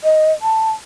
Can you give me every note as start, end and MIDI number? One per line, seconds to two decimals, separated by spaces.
0.04 0.32 75
0.42 0.71 81